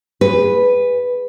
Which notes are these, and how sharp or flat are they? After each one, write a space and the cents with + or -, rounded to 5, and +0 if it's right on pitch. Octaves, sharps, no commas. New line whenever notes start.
G#4 -30 B4 +0